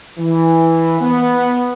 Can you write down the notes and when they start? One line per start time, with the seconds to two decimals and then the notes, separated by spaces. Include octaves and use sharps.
0.19 E3
1.01 B3